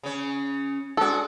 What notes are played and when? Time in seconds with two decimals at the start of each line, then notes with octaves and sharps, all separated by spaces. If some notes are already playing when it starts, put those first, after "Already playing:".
0.03 C#3 C#4
0.97 G#3 D4 F#4 A4